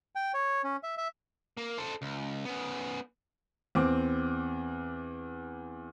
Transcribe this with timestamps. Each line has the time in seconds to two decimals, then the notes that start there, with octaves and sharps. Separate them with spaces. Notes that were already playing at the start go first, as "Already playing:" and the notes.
0.15 G5
0.34 C#5
0.64 C#4
0.83 E5
0.98 E5
1.57 A#3
1.78 A4 C5
2.02 C#2
2.45 B3 C#4
3.75 E2 C4 D6